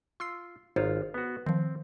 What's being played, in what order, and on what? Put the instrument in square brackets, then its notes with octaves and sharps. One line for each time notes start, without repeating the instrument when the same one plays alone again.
[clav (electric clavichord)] F4 [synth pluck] C6 E6 C7
[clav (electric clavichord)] G#1 F4 [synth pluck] D#4 C5 C#5
[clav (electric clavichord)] B3 F#4
[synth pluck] D#3 F3 [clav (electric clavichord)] C4